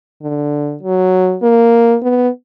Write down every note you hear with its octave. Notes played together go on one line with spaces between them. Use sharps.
D3
F#3
A#3
B3